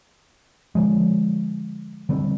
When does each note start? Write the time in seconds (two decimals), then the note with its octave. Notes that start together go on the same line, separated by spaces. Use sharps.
0.75 D3 F3 G#3
2.09 D3 G3 C4